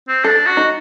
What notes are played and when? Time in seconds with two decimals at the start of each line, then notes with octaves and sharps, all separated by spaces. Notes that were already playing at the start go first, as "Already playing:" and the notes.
0.08 C4
0.24 D4 A4
0.46 F#4
0.57 D#4